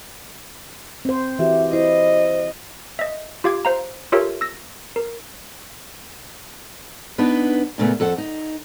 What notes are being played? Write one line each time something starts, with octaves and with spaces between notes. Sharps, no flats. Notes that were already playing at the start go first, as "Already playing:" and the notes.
C4 C5
E3 F#4 G4 E5
E4 C5 D#5
D#5 E5
F4 G4 F5 D6 G#6
C5 F5 A#5
F4 G4 A4 A#4 C#5 E5
E6 A#6
A#4
B3 D4 D#4 B4
A#2 C#3 A3 B3
F2 A4 F#5
D#4